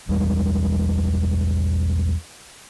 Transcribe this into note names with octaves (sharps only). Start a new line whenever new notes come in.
B1 E2 G3 G#3